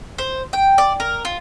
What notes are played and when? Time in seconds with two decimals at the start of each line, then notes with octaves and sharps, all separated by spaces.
0.18 C5
0.53 G5
0.78 D5
1.00 A#4
1.25 F4